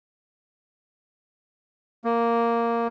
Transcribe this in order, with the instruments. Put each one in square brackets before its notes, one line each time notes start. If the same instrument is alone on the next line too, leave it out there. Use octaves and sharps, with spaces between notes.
[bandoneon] A#3